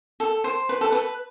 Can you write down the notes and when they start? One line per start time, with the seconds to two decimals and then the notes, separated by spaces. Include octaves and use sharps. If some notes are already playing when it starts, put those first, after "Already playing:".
0.20 A4
0.44 C5
0.69 B4
0.81 A4
0.92 B4